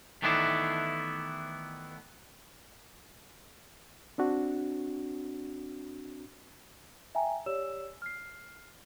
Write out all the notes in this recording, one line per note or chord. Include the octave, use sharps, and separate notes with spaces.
D#3 E3 A3 B3 D4 E4
C4 D4 F#4
E5 G5 G#5 A#5
G4 C#5 D5 E6 E7
F6 C7